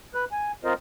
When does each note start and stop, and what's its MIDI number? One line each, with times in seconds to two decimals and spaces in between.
0.14 0.25 71
0.14 0.25 90
0.32 0.52 80
0.64 0.74 60
0.64 0.74 65
0.64 0.74 70
0.64 0.74 72
0.64 0.74 75